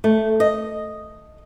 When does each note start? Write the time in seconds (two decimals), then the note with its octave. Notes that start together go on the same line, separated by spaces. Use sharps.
0.04 A3
0.40 D#5